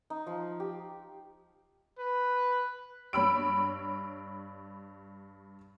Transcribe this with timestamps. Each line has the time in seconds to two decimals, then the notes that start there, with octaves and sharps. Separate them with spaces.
0.10 D#4
0.27 F3
0.60 G4
1.99 B4
3.13 G2 C#5 B5 E6 D7